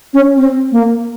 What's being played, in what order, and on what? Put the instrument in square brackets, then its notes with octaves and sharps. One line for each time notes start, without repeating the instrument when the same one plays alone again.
[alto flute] C#4
C4
A#3